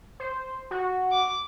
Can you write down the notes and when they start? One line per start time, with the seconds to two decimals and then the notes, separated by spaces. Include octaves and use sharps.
0.20 C5
0.71 F#4
1.11 D6